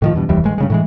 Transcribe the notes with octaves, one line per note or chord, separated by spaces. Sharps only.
A2 D#3 F3
E2 G2 B2
F1 D#2 E3 G3
A1 G#3
G2 C#3 G#3
A2 E3 G#3